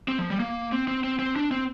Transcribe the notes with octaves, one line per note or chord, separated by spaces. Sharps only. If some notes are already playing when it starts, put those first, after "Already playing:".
C4
F3
G3
A#3
C4
C4
C4
C4
D4
C4